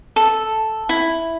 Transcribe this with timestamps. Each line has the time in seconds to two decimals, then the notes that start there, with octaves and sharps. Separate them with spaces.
0.16 A4
0.89 E4